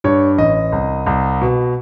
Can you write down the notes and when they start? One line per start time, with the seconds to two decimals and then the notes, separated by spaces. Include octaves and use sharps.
0.04 G2 C#5
0.38 A1 D#5
0.72 C2
1.07 C2
1.41 B2